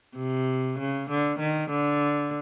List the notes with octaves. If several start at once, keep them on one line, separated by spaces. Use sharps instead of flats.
C3
C#3
D3
D#3
D3